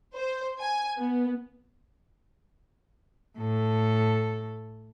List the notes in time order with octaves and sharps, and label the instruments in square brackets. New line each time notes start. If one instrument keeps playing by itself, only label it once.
[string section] C5
G#5
B3
[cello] A2 A4